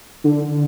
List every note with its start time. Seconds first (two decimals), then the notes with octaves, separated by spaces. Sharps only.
0.24 D3